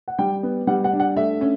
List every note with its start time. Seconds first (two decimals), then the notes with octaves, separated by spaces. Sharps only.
0.08 F#5
0.19 G3 G5
0.43 B3
0.67 G3 F#5
0.84 F#5
0.92 D4
1.00 F#5
1.16 A3 E5
1.41 C#4